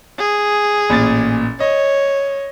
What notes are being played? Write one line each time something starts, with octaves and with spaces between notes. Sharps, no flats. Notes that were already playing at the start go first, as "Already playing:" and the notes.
G#4
A1 A#2 A6
C#5 D#5